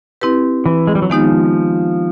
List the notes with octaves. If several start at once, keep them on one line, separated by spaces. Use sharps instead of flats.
C4 E4 G4 B4
E3
G#3
G3
F#3
D#3 F3 G#3 B3 D#4 G4